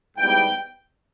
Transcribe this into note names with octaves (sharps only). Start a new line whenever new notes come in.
G#2 E3 G3 B3 D#4 G5